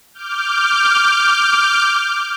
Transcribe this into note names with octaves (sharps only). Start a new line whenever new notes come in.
D6 F6 G6